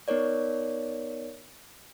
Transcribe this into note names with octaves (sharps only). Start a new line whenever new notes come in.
B3 D#4 A#4 C#5 D5